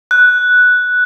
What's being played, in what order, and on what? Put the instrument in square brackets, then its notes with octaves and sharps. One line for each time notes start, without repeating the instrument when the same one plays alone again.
[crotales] F#6